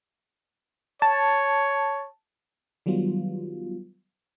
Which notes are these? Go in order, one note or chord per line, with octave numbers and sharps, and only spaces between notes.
C#5 A5
D#3 F#3 G3 B3 F4